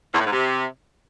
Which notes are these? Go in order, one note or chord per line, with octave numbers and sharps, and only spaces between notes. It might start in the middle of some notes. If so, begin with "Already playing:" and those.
E2
A2
G#2
C3